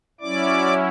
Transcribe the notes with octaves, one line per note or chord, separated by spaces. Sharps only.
F#3 C#4 E4 D5 D6